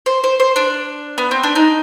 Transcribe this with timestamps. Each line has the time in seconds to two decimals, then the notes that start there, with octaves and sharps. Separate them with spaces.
0.06 C5
0.24 C5
0.40 C5
0.56 D4
1.18 B3
1.31 C4
1.43 D4
1.55 D#4